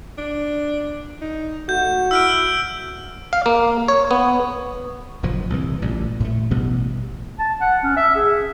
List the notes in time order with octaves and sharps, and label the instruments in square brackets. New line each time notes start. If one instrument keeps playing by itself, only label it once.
[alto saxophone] D4
D#4
[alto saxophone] A3 [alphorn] F#4 [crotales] G6
[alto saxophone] E4 [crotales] E6 F6 D7
[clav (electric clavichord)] F5
A#3
C#5
B3
[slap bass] F#1 A#2 F3
C2 E3
A1 A#2 G3
A2 A3
A1 B2 G3 B3
[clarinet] A5
F#5
C#4
E5
G#4